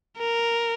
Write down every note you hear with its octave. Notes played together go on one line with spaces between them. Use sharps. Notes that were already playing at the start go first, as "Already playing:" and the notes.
A#4